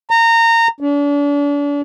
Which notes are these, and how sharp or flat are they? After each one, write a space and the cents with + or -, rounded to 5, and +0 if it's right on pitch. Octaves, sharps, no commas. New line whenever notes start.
A#5 -20
D4 -40